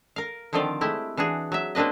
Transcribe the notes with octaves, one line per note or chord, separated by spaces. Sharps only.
A#4 F5
D3 D#3 F3 C4 F4 D5
G#3 A3 E4 G4
E3 D4 F#4 G#4
F#3 E5
A#3 C4 D4 B4 D#5